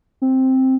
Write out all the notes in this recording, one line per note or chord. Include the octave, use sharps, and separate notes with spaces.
C4